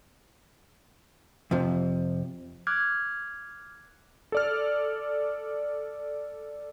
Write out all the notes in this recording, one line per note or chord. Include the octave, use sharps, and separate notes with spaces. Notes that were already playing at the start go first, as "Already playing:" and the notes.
F2 C3 F3
D6 F6 F#6 G#6
A4 D5 F6